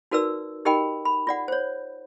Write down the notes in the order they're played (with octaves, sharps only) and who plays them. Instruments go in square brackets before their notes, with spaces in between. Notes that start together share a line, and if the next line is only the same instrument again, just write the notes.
[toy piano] D#4 F#4 A#4 B4 D5 E6
D#4 G4 A#4 D#5 G5 B5
B5
F4 D5 F#5
C5 C#5